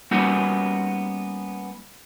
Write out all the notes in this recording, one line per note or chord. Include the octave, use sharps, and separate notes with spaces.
G3 A#3 B3 C#4 D#4 F#4